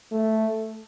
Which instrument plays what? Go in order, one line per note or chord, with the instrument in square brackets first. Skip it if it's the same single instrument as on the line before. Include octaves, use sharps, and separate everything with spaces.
[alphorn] A3